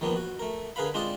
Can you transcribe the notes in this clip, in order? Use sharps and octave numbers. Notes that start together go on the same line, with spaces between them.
D#2 D#3 F3 A#3 B3
F#4
A3 A#4
D3 G#4 A#4 B4 F5 B5
G#3 C4 D4 F4 D5 D#5